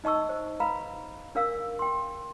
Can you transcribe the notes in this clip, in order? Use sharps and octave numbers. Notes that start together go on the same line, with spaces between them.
D#4 D#5 A5 C#6 E6
C5
B4 F5 A#5 B5
D4 A#4 F5 E6
G5 C6